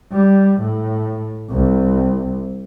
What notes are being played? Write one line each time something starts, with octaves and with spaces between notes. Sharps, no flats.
G3
A2
C2